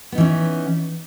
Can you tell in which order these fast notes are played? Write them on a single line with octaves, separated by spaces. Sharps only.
B3 D#4 E3 C#4